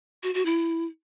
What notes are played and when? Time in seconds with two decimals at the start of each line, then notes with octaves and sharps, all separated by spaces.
0.23 F#4
0.34 F#4
0.46 E4